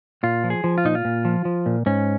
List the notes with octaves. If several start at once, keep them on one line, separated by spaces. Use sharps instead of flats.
A#2 F4
F3
G#4
F3
F4
A#2 D#4
F4
A#2
F3
F3
A#2
G#2 C#4